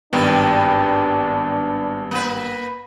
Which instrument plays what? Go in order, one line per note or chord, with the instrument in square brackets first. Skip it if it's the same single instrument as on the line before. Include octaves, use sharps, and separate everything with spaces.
[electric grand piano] G#1 G2 B3 [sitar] D#3 G3 [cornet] D4
[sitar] A#3 B4